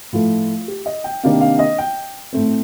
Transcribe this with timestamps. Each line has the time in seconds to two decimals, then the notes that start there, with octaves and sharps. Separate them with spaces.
0.13 A2 F3 A3 F4
0.68 G4
0.86 D#5
1.04 G5
1.24 C3 D#3 A#3 D4 F5
1.41 F5
1.59 D#5
1.78 G5
2.33 A2 A3 C4